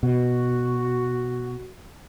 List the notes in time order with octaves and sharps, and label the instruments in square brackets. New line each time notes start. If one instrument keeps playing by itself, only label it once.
[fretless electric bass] B2 [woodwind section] F#4